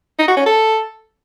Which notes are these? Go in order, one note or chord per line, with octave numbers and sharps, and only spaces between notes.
D#4
F#4
C#4
A4